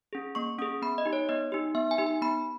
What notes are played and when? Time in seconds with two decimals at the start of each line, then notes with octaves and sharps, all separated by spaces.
0.13 C#4 G#4
0.35 A#3 C#6
0.58 C#4 G#4 D#6
0.82 B3 B5
0.98 D#5
1.06 D#4 G4
1.13 C#5
1.29 B3 D#5
1.52 D#4 G4
1.75 B3 E5
1.91 G#5
1.98 D#4 G4
2.07 G#5
2.22 B3 B5